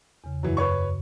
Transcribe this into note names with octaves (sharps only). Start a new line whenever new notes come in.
E2 C#3
F#2 E3 F#3
B4 C#5 C#6